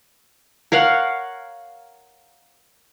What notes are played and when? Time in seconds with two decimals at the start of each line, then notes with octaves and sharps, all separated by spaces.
0.72 A#4 C#5 F5 F#5